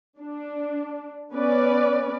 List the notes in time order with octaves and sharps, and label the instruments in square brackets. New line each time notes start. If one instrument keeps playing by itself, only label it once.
[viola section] D4
B3 C#4 B4 D5